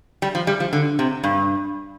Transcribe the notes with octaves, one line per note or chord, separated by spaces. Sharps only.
G3
F3
G3
F3
D3
C3
G2